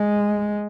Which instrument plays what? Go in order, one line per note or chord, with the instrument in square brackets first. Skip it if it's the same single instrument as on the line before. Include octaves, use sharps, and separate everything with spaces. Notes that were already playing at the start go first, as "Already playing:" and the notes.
Already playing: [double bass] G#3